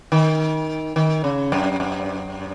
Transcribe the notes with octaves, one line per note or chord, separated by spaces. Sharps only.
D#3
D#3
C#3
F#2
F#2